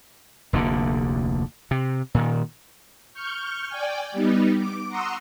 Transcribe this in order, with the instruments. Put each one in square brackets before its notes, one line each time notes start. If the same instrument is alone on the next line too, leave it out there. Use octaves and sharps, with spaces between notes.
[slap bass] F1 D2 D3 A#3
C3
A#2 D#3
[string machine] C#6 F6 G6
D5 G5 G#5
G3 B3 D#4
D6
F#5 A#5 C6 C#6 D#6 E6